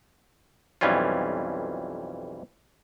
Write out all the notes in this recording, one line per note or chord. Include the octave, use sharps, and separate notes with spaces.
B1 F2 E3 G3 C#4 F4